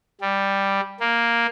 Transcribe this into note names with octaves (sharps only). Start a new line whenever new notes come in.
G3
A#3